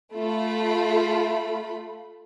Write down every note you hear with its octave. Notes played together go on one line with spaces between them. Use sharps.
A3 F4 B5